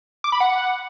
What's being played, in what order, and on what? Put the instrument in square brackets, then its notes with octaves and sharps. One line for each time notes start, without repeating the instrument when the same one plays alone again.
[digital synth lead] D6
B5
F#5